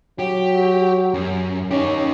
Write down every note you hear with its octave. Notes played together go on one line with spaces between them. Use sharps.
F#3 G4
F#2
C#4 D#4 G4